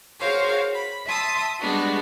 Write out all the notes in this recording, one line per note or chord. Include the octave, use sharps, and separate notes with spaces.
F#4 G#4 A#4 C5 C#5 F5
B5
E5 A5 C6 D#6 E6
G3 G#3 B3 D4 F#4